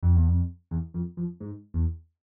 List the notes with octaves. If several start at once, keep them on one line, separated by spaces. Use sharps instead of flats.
F2
E2
F2
E2
F2
F2
G#2
E2